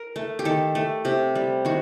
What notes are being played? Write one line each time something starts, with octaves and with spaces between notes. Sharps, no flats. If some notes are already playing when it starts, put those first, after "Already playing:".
Already playing: A#4
A3
G4
D#3 A4
A3
C3 G4
G3
D#3 F#4